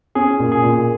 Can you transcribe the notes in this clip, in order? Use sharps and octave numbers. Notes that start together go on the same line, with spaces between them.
C#4 G#4
A#2
G#4
A#2